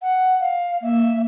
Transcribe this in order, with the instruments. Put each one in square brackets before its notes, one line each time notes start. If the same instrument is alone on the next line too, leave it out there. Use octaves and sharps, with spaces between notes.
[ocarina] F#5
F5
[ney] A#3 [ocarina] E5